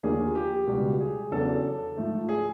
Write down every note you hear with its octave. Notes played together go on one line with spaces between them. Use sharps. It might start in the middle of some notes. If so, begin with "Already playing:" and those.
D#2 D3 F3 A#3 G#4
G4
C#2 B2 G3
G#4
E2 C#3 F#3 B3 D4 A4
G#2 F3 A3
G#4